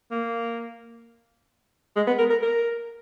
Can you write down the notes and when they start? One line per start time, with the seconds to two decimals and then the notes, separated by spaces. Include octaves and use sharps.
0.11 A#3
1.96 G#3
2.07 B3
2.18 A#4
2.30 A#4
2.42 A#4